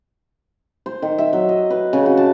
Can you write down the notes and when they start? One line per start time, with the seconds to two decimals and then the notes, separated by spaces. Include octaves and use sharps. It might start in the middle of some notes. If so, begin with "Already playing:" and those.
0.86 C5
1.02 D#3
1.18 E5
1.33 F#3
1.49 D#5
1.70 B4
1.93 C#3
2.06 F#4
2.17 A5